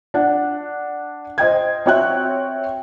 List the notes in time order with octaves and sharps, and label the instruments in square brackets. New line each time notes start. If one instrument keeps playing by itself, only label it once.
[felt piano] D4 F#5
C5 D#5 G5 G#6
C4 F#4 C#5 E5 G5 F#6